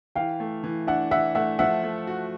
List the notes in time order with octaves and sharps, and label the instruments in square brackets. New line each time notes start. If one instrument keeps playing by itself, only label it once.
[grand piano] E3 [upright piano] F5 G5
[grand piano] A3
E3
[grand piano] D4 [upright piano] E5 F#5
[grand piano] E3 [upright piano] E5 F#5
[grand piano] A3 [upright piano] E5 F#5
[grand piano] F3 [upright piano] E5 F#5
[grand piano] A3
F#4